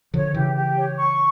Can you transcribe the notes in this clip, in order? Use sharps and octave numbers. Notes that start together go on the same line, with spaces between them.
D3 F3 C#5
C#3 E3 G4
G4
C#5
C#6